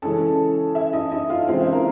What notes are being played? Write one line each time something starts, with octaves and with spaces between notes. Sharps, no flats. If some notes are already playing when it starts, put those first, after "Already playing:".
C#3 E3 G#3 C#4 A4 A5
E4 E5
D#4 D#5
D#4 D#5
F4 F5
C#3 E3 G#3 C4 F4 F5
E4 E5
A#3 A#4